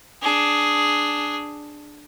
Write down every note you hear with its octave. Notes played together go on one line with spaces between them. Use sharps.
D4 G#4